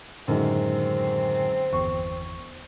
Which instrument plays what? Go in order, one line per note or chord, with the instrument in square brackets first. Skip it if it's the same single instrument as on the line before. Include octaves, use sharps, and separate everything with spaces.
[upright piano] F#2 D#3 G#3 [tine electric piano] A2 D3 A#4 [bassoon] C4
[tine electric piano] G1 E2 [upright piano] C#6